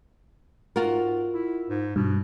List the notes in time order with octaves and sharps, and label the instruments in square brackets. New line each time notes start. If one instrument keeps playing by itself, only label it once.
[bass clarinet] G#2 [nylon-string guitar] F4 F#4 A#4
[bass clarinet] E4
G#2
[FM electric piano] G2 [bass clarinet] B2